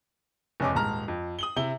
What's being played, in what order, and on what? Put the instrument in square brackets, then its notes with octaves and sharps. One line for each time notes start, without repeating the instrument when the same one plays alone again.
[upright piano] F1 E2 C#4 D#5 D6
D#1 G#2 A5 A#5 F6
F2
D#6 F#7 G7
C3 E4 G7